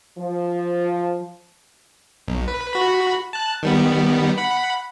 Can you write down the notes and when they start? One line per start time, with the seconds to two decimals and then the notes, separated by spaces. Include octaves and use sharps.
0.18 F3
2.28 B1
2.48 B4
2.73 F#4 B5
3.33 A5 F#6
3.63 D#3 G3 B3
4.38 F#5 B5